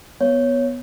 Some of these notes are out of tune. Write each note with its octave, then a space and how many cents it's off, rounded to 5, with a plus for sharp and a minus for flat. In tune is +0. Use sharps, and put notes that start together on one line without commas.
B3 +0 C#5 +0